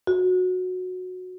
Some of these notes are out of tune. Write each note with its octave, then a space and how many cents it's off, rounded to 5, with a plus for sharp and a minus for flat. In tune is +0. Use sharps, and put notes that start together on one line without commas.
F#4 -15